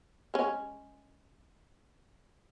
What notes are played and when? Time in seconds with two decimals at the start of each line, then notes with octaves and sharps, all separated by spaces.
0.34 G#3 C#4